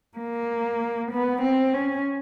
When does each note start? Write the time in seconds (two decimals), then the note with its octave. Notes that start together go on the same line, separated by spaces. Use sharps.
0.18 A#3
1.12 B3
1.42 C4
1.73 C#4